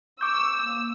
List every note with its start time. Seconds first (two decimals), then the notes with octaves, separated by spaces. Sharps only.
0.21 C#6 D6 E6 G6
0.59 A#3